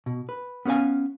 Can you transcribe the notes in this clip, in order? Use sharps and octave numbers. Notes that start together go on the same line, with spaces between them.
B2
B4
B3 C#4 C5 F5 G#5